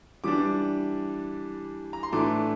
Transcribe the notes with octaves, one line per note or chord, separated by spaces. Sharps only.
E3 G3 D4 D6
A#5
C6
A2 E3 A3 D4 D6